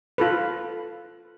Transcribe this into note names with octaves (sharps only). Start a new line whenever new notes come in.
F4 A4 B4